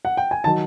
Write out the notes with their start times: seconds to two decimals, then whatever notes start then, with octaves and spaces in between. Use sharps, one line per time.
0.05 F#5
0.17 G5
0.31 G#5
0.44 D#3 F#3 A5